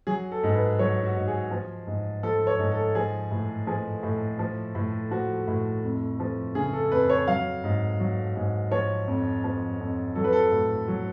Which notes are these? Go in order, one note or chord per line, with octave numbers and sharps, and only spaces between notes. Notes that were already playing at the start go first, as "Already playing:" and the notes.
F#3 G#4
A4
G#2
B4
F#3 C#5
F#4
G#2
G#4
F3
G#2
F3 A4
C#5
G#2
A4
F3 G#4
A2
F3 G#4
A2
F3
A2
F3 F#4
A2
F2
F3
C#3 G#4
A4
F2 B4
C#5
F#3 F5
G#2
F#3
G#2
F3 C#5
F2
F3
F2
F#3 A4
B4
A4
A2
F#3